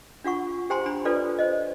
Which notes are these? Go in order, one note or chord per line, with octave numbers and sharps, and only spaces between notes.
D4 F4 F#5 C#6
G4 C5 G5 G#5 A#5 C6
D4 G#5 B5
D4 F4 A4 B4 D5
C5 D#5